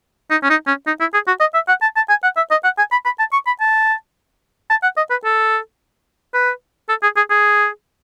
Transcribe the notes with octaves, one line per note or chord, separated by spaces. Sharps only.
D#4
C#4
D#4
C#4
D#4
E4
G#4
F#4
D#5
E5
F#5
A5
A5
G#5
F#5
E5
D#5
F#5
G#5
B5
B5
A5
C#6
B5
A5
A5
F#5
D#5
B4
A4
B4
A4
G#4
G#4
G#4